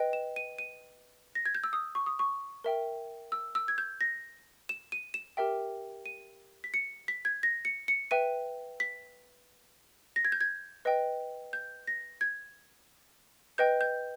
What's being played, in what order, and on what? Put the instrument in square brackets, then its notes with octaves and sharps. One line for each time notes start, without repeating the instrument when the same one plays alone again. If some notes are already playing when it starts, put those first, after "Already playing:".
Already playing: [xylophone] B4 D#5 G5
E7
D#7
D#7
A#6
G#6
G6
E6
D#6
C#6
D#6
C#6
A#4 E5 G5
E6
E6
G#6
G6
A#6
E7
D#7
E7
G4 A#4 E5 G5
D#7
B6
C#7
B6
G#6
A#6
C#7
C#7
B4 E5 G5 D#7
B6
A#6
G#6
G6
G#6
B4 D#5 G5
G6
A#6
G#6
B4 D#5 G5 G6
G6